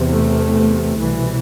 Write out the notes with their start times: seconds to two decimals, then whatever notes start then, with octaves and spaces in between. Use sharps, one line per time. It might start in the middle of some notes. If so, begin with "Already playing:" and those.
Already playing: E2 C3
0.11 A3
0.97 C2 B2 E3